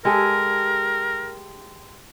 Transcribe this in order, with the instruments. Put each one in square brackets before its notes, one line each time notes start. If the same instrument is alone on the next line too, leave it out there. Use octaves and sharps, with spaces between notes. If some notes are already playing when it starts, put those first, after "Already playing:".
[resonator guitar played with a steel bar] G#3 G4 A4 [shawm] A#4